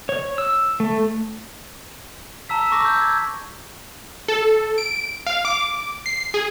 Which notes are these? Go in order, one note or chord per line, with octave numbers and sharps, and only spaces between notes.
C#5
E6
A3
A5 A#5 E6 B6
C#6 D6 A#6
E6 G6
G#6
A4
D7
F5
D6
C7
G#4